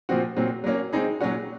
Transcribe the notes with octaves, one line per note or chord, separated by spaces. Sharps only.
A#2 F3 C4 F#4
A#2 F#3 C4
F#3 A#3 C#4
G#3 C4 D#4 G#4
A#2 F#3 C#4 F#4